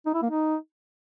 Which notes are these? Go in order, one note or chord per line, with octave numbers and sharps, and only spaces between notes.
D#4
E4
A#3
D#4